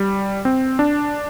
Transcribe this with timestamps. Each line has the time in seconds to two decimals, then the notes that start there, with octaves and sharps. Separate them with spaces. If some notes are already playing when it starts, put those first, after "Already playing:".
Already playing: G3
0.45 C4
0.79 D4